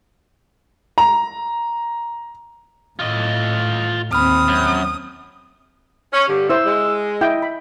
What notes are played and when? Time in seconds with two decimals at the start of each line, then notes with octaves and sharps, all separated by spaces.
0.98 A#5
2.99 A2 F4 D#5
4.13 D#2 C4 B5 D#6 F6
4.48 F#2
6.13 C#4
6.28 G2 D3 G4
6.50 E4 C5 E6
6.65 G#3
7.21 E4 D#5 G5
7.42 B5